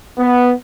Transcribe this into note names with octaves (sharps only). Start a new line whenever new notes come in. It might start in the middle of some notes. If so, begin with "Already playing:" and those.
B3